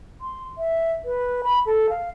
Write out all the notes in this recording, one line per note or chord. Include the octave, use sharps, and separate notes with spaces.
C6
E5
B4
B5
A4
F5